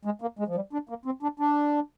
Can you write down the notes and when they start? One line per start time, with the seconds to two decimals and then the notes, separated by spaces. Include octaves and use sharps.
0.05 G#3
0.22 A#3
0.39 G#3
0.47 F3
0.55 G3
0.73 D4
0.89 A#3
1.05 C4
1.23 D4
1.40 D4